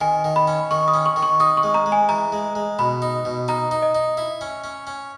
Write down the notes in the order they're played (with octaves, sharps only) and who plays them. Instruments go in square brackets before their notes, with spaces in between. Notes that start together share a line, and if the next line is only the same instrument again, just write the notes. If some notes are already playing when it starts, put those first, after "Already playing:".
[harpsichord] D#3 [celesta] G#5
[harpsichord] D#3
[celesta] B5
[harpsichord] C#4
[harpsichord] D#3 [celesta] C#6
[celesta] D#6
[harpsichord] C#4
[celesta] C#6
[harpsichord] D#3
[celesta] C#6
[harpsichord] D#4 [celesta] D#6
[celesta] C#6
[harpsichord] G#3
[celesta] A#5
[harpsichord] G#3
[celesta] G#5
[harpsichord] E3 [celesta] A#5
[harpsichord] G#3
G#3
[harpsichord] B2 [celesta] B5
[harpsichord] D#4
B2
[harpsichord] D#4 [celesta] A#5
[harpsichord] D#4
[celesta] D#5
[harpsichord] D#4
E4
C#4
C#4
C#4